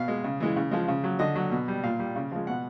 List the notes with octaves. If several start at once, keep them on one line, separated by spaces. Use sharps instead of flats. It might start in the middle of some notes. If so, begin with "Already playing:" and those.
Already playing: B2 F5
G#3
C#3
E3 G#3
C#3
F3 G#3
C#3
F#3
D3 D#5
F#3
B2
G3
A#2 F5
G3
C#3
F3 G#3
B2 F#5